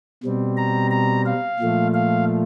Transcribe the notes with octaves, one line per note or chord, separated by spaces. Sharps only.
B2 G3 C4
A#5
A#5
F5
A#2 F3 A3
F5